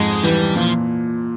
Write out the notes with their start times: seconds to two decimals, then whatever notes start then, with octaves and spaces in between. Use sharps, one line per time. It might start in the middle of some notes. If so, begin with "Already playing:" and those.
Already playing: F2 G#2 G#3
0.23 E3 G3
0.56 A#2 F3